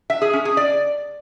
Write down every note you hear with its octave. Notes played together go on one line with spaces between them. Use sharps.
E5
G#4
C#4
G#4
D5